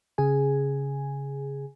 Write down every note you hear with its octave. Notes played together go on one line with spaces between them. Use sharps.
C#3 G#4 G#5